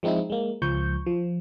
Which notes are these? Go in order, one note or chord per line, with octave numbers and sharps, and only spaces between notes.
F3 G#3 C4 D#4 E4
G#3 A#3
C#2 F3 C#6 G6
F3